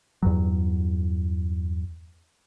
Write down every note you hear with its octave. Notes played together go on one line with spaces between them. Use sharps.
E2 G2 F#3